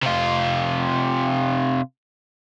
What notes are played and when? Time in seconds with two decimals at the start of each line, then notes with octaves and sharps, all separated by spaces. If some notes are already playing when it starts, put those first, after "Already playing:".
0.03 C3 F4